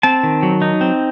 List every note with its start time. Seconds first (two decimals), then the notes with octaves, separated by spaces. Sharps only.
0.03 C4 A5
0.23 D#3
0.43 F#3
0.62 D#4
0.81 C4